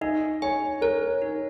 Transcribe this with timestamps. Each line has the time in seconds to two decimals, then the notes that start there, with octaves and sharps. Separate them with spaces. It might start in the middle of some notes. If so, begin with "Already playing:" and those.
0.01 D#4 D#5
0.42 C#5 G#5
0.81 A#4 C#5
1.22 D#4